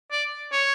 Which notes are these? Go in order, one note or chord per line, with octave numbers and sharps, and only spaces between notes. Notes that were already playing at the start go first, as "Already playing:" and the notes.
D5
C#5